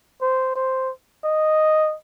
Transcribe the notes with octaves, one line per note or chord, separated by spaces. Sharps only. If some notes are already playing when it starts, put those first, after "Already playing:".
C5
C5
D#5